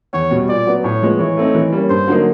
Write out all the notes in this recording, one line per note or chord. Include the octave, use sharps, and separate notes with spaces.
E2 C#5
B2 G3
A#2 D5
F#3 B3
A2 C#5
F3 G#3 B3
E3 C#5
A3 C4 D#4
E3
G3 A#3 C#4
G2 C5
D3 F#3 A#3 D#4